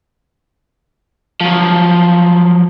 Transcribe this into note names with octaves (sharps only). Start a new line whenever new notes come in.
F3 F#3